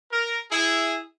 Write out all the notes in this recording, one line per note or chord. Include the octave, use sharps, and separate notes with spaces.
A#4
E4 G#4